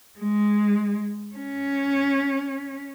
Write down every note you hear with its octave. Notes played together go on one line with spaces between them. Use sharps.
G#3
C#4